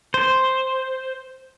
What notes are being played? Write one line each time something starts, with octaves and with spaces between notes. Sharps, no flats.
C5